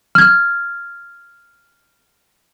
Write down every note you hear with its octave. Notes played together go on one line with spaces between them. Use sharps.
F6 G#6